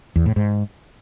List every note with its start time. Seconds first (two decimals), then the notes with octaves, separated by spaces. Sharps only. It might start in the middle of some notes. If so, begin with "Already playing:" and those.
0.16 E2
0.26 A2
0.36 G#2